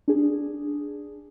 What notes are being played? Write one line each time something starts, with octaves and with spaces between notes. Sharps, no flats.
D4 G#4